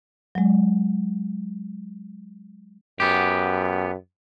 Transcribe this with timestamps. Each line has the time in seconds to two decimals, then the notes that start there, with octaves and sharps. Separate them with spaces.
0.35 F#3 G#3
3.00 F#2 B3 G4